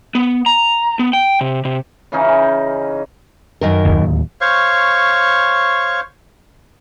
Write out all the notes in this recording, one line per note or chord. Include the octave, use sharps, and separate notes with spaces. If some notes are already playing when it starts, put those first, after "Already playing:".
B3
A#5
B3
G5
C3
C3
C#3 E3 C#4 D#4
F#2 D#3 A#4
D1 G1 D#2
C5 C#5 F5 C#6